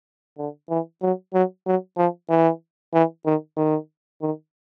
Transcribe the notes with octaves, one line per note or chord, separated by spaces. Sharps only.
D3
E3
F#3
F#3
F#3
F3
E3
E3
D#3
D#3
D#3